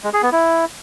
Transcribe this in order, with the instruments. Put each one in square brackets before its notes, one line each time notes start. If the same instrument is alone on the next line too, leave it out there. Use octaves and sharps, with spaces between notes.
[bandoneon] G#3
G#4
B3
E4